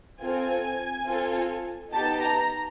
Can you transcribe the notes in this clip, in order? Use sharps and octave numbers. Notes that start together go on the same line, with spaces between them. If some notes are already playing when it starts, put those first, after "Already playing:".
C4 F4 A4 G#5
C4 F4 A4
B3 D#4 G4 A5
A#5